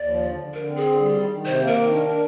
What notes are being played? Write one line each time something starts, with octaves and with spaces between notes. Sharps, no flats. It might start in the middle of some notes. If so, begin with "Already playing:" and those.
Already playing: D#2 D5
F3
D3
D3
D3 A#4
C4
G#4
D3
G3
D#3
D#3
C3 C5
A#3
A#4
D#3
D4
D4